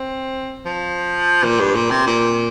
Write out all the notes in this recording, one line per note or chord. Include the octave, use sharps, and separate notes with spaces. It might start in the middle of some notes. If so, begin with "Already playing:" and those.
Already playing: C4
F3
A#2
G2
A#2
C3
A#2